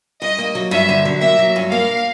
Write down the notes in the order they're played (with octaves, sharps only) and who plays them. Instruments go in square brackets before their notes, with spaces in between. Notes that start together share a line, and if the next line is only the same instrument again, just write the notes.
[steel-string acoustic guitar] G2 [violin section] D#5
[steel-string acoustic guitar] A#3
F#3
[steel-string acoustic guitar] G2 [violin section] E5
[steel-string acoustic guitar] D3
F#3
[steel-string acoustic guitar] A#3 [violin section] E5
[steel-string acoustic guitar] F#3
G2
[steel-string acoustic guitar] A#3 [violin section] F5